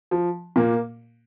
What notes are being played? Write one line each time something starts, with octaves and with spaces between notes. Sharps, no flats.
F3
A#2 A#3